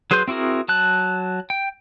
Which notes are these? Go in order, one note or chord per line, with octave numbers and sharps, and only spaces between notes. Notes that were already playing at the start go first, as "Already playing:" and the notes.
F#3 G#4 B4 C6 G6
C4 E4 F#4 G#4 A#4
F#3 A5 F#6
G5